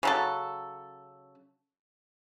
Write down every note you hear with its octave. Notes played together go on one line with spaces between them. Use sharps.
C#3 F#3 A4